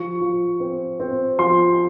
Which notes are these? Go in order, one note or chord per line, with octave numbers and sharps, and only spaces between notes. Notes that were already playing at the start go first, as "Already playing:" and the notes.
Already playing: F3 C#6
F3
C4
C4
F3 C6